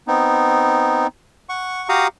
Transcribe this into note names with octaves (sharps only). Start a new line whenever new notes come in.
B3 C4 D#4
F#5 C#6
F#4 G4 F5 F#5 A#5 D#6